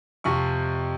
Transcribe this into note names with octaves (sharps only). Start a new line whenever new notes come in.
F2 C3 F3 C#6